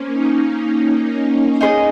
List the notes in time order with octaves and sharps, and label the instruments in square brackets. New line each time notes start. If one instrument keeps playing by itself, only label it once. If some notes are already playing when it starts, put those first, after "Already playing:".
Already playing: [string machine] A#3 C#4 [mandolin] C5
[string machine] D#4
[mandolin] D#4 G#4 C5 D#5